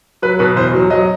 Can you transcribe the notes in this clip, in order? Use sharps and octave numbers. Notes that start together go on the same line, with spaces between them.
F#3 B4
B2 B4
E2 C5
F#3
F#3 D#5